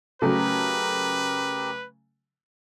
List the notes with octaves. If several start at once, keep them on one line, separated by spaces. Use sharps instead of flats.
C#3 F#3 A3 G4 A#4 B4